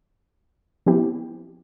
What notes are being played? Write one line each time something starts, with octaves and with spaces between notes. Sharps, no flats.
F3 B3 C4 E4 G4